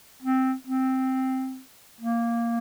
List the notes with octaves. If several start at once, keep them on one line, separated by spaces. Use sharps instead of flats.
C4
C4
A#3